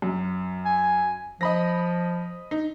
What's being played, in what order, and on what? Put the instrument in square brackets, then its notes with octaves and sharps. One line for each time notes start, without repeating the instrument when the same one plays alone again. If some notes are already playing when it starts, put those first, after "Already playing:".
[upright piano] F#2
[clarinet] G#5
[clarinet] F3 [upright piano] D#5 B5 A#6
[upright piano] D#4